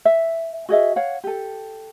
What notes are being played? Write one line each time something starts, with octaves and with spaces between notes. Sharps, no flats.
E5
F#4 G#4 D#5 E5
C#5 F5 F#5
G4 A4